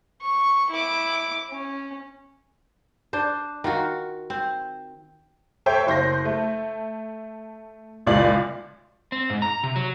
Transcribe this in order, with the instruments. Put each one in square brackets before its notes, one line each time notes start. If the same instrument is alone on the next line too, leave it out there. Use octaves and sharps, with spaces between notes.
[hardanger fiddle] C#6
E4 D6
C#4
[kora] D4 C5
D#3 F4 F#4
C4
[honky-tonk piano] A4 C5 C#5 E5 G5
F#1 C5 G6 A#6
A3
F#1 C#2 A#2 D5 F#7
[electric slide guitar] C4
G#2
A#5
C3
F#3